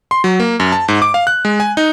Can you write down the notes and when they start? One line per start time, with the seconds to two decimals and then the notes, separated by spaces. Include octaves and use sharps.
0.11 C6
0.24 F#3
0.40 A#3
0.60 F#2
0.72 A5
0.88 G#2
1.02 D6
1.14 F5
1.27 F#6
1.45 G#3
1.60 G#5
1.77 D#4